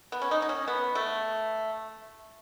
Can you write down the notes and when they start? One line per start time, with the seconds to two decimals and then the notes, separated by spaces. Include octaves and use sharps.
0.12 B3
0.22 C#4
0.31 D#4
0.42 D#4
0.49 C#4
0.68 B3
0.95 A3